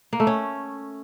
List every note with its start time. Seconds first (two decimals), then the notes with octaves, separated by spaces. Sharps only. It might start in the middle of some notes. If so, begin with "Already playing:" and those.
0.13 A#3
0.20 A3
0.27 C#4